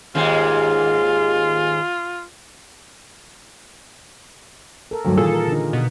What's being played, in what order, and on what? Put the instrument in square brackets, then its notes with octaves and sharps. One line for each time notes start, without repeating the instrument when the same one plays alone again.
[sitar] D#2 G#2 G#3 [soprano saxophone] F4
[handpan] A4 A#4
[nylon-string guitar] D2 G2 F#3
[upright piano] A#2 [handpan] D#3 E3 [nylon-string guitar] G#4 [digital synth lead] A4
[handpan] A#4
D3 D#4
[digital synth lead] B2